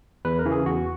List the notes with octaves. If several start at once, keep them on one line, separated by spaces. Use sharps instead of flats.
E2 B4
A#4
C#3 E3
G#4
E2 F#4